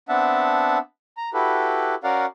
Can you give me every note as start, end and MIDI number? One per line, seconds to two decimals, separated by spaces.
0.09 0.78 59
0.09 0.78 60
0.09 0.78 62
0.09 0.78 76
0.09 0.78 78
0.09 0.78 81
1.17 1.30 82
1.34 1.95 64
1.34 1.95 66
1.34 1.95 67
1.34 1.95 69
1.34 1.95 71
2.04 2.26 61
2.04 2.26 66
2.04 2.26 70
2.04 2.26 74
2.04 2.26 77
2.04 2.26 78